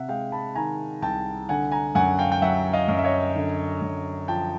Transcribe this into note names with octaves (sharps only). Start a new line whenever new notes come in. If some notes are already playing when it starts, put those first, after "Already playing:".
Already playing: C3 E5 F#5
G#3 F5 G5
A5 B5
D#3 G#5 A#5
C2 G5 A5
D3 F#5 G#5
G#5 A#5
F#2 F#5 G#5
F5 G5
G5
F#3 E5 F#5
D#5 F5
F#2
E5
C#5 D#5
D3
F#2
F3 G5 A5